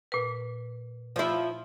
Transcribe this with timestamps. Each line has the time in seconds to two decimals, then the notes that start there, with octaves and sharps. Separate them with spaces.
0.12 A#2 B4
1.16 F3 E4